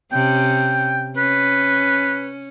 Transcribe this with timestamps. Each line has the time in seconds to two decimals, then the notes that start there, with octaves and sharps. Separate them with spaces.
0.12 C3 C#4 G5
1.17 C#4 B4